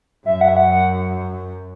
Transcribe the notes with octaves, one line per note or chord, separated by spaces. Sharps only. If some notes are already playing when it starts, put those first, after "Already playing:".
F#2 E5
F#5
E5
F#5
F#5